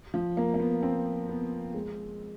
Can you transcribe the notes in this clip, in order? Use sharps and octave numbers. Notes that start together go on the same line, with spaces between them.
F3
A#3
A#3
B3
C4
B3
G#3